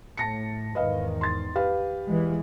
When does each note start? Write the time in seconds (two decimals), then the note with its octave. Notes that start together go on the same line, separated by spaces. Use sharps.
0.17 A2 A5 A#6 C#7
0.75 E2 G#2 D#3 B4 D#5 F5
1.21 C6 A6
1.56 G4 B4 F5
2.08 E2 E3 G#3